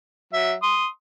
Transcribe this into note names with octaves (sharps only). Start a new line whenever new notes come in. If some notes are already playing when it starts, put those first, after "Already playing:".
F#3 E5
C6 D#6